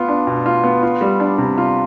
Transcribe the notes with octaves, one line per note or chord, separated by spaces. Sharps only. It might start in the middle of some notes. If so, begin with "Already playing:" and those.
Already playing: B3 F4
D4
B2
F4
B3
F4
G3
D4
C3
F4